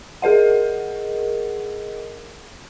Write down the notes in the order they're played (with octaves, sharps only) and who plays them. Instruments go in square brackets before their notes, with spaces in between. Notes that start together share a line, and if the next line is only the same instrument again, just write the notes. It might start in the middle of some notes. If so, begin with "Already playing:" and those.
[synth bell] G#4 A#4 D#5 F#5